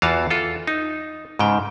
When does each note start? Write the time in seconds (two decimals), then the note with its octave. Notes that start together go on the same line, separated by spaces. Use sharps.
0.02 E2 E3 F4 F#4 F5 A5
0.30 F4 A4
0.67 D#4
1.39 G#2 C#3 G5